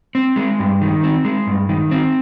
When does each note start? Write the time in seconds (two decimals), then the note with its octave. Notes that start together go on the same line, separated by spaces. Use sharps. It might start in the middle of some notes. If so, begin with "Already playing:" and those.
0.15 C4
0.36 G#3
0.59 G2
0.82 D#3
1.03 C4
1.25 G#3
1.47 G2
1.69 D#3
1.91 C4